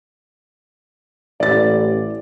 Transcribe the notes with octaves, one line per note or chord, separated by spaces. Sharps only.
A1 D5 A6